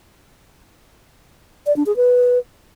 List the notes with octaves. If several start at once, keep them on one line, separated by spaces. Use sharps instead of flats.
D5
D4
G#4
B4